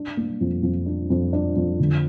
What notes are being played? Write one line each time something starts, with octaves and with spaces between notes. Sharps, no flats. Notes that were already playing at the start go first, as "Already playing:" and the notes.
Already playing: D4
A#3
F2
F2
D4
F2
D4
F2
D3